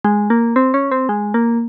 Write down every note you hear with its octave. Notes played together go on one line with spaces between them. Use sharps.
G#3
A#3
C4
C#4
C4
G#3
A#3